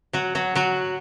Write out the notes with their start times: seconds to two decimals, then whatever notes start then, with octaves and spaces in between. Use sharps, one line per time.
0.13 F#3 F#4
0.35 F#3 F#4
0.55 F#3 F#4